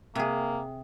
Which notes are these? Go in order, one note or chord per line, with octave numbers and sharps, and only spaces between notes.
C3 A#3 G#4